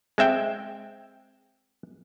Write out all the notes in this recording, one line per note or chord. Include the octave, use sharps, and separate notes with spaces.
G#3 C4 E5 G5